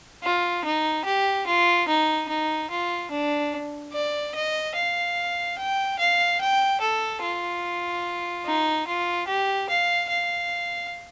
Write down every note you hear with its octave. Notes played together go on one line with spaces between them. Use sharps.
F4
D#4
G4
F4
D#4
D#4
F4
D4
D5
D#5
F5
G5
F5
G5
A4
F4
D#4
F4
G4
F5
F5